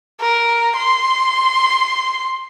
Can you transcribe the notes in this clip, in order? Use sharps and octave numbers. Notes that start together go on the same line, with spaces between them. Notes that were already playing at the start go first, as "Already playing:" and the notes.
A#4
C6